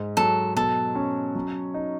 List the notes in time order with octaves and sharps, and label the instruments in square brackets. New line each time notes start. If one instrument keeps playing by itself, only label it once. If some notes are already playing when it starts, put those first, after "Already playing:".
Already playing: [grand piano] G#2
[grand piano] F#3 [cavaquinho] A4
[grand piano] B2 [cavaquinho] A4
[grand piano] C#4
F#3
D#4